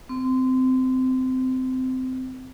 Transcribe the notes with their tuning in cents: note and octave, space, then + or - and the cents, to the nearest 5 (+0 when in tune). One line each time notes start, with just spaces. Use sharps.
C4 -20